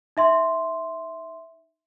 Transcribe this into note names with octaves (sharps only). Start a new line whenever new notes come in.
D#4 E5 C6